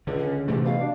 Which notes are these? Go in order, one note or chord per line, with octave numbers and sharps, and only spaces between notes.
C#2 D3
C#4
G#2 C3 E3 A3 G4
B2 F5
D4